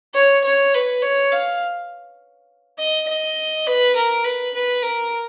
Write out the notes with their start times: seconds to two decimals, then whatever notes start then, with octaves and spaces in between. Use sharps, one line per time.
0.14 C#5
0.44 C#5
0.74 B4
1.02 C#5
1.32 F5
2.79 D#5
3.08 D#5
3.67 B4
3.96 A#4
4.25 B4
4.54 B4
4.83 A#4